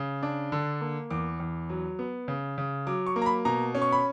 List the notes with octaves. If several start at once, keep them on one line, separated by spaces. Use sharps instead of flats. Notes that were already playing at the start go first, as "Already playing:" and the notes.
Already playing: C#3
D4
D3
A#3
E2 D6
E2
F#3
B3
C#3
C#3
F#3 D6
C#6
A#3
A#5
B5
B2 A#5
C#4
C#6
B5